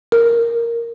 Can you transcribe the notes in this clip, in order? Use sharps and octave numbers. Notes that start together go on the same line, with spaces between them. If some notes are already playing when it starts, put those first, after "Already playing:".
A#4